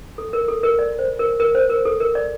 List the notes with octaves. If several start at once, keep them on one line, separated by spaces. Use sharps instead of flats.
A4
A#4
A4
A#4
D5
C5
A#4
A#4
C5
A#4
A4
A#4
D5